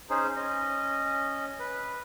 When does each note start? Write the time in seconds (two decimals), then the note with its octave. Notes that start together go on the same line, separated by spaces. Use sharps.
0.10 C#4 D#4 G#4 C5
0.36 C#4 D#5
1.60 B4